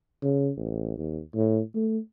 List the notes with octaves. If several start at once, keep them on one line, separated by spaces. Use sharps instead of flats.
C#3
A1
D#2
A2
A3